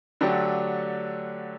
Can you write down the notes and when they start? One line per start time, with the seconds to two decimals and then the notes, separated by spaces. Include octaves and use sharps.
0.21 D3 F#3 A3 D4 G4